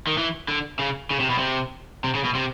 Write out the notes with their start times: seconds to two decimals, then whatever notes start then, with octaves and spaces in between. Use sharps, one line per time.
0.07 D#3
0.18 E3
0.48 D3
0.79 C#3
1.11 C#3
1.20 C3
1.30 B2
1.38 C3
2.04 C3
2.15 C#3
2.24 B2
2.35 C3